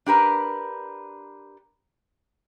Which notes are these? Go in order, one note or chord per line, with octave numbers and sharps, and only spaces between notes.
D4 G4 A#4 B4